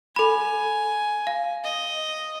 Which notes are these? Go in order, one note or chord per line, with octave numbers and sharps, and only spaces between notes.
A4 G#5 B5
F5
D#5